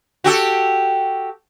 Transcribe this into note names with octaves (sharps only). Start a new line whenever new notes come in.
F#4 G4 A4